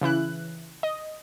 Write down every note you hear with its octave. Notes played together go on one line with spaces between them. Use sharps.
C#3 E3 E4 F#6
D#5